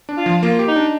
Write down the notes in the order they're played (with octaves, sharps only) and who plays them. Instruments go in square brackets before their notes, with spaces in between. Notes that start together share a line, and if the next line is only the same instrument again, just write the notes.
[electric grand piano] D4
[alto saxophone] F4
[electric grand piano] F3
[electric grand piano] A#3 [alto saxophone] F4
[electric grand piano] G4
[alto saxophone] D#4
[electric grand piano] D4